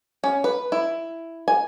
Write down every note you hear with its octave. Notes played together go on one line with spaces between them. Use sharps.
C#4
B4
E4
G#5